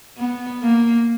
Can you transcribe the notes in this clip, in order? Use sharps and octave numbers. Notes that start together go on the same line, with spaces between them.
B3
A#3